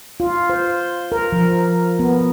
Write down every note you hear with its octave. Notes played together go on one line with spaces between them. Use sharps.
F4
C5
A#4
F3
B3